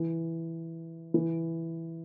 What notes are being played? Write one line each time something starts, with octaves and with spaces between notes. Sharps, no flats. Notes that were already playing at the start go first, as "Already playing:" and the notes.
Already playing: E3
E3